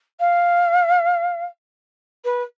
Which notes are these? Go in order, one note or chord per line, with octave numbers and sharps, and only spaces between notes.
F5
B4